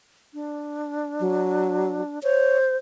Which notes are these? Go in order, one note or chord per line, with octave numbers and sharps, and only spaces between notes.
D4
F#3
C5 C#5